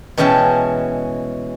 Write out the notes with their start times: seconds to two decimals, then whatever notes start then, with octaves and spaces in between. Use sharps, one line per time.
0.18 B2 E3 G#3 C#4 G5 A5